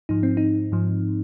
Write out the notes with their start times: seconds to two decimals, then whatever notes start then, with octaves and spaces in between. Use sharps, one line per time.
0.09 G#2 F3 D#4
0.23 C4
0.37 D#4
0.72 G#2 F3